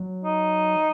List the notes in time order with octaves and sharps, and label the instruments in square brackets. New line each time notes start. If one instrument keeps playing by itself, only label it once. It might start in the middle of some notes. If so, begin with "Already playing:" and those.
Already playing: [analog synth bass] F#3
[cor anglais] D#4